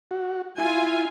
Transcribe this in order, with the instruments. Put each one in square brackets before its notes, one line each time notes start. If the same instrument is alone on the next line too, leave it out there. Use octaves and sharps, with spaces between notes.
[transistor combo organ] F#4
[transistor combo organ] E4 [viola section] F4 G#5